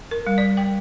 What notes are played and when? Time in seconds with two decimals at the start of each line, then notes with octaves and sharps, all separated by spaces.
0.11 A#4
0.27 G3
0.38 D5
0.57 G5